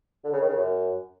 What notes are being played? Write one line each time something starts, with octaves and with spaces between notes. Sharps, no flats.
D3
C#3
D#3
C#3
F#2